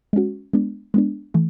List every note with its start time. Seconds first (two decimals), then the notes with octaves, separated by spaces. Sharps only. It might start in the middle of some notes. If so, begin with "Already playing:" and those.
0.13 G#3 C#4 F#4
0.53 G#3 B3 D4
0.94 G#3 B3 D4
1.34 E3 A3